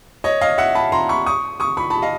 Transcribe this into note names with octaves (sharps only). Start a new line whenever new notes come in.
C#5 D#5
D#5 F5
E5 F#5
A5 B5
A#5 C6
B5 C#6
C#6 D#6
C#6 D#6
B5 C#6
A5 B5
D#5 F5